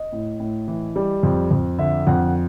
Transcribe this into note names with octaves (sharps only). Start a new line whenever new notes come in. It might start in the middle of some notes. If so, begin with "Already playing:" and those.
Already playing: D#5
A2
A2
E3
G3
F2
F2
D3 E5
F2 F#5